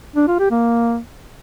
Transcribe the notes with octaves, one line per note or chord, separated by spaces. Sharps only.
D4
F4
G4
A#3